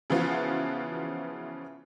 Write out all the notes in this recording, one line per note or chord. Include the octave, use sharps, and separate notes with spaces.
C#3 E3 F3 B3 F4 F#4